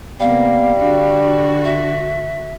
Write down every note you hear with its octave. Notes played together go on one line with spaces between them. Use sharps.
C3 G3 A#3 B3 F5
D3 D4 F#4
E5